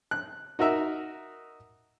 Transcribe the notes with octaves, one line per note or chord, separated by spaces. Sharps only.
F#6
D#4 F#4 A#4 E5